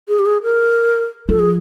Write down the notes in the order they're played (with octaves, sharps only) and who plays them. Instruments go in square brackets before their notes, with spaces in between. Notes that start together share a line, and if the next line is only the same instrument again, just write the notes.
[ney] G#4
G4
G#4
A#4
[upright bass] F3 [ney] A4
[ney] G#4